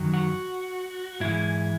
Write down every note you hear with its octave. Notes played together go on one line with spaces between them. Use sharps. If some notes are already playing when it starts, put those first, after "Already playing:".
Already playing: F#2 D#3 F#3
F#4
G#2 E3 G#3 E4